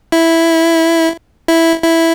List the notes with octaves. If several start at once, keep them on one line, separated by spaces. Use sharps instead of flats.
E4
E4
E4